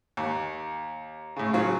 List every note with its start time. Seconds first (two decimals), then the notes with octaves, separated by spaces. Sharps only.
0.17 D#2
1.36 A2 C#3
1.53 C#3 F#3 F4